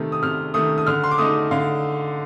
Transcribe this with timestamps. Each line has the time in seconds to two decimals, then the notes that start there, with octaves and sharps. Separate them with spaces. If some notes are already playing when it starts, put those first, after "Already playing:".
Already playing: C3 D#3 A3
0.12 D#6
0.23 C3 F6
0.54 D#3 A3 D#6
0.78 D#6
0.86 D3 F6
1.04 C6
1.11 D6
1.18 A3 D#4 D#6
1.51 D3 F5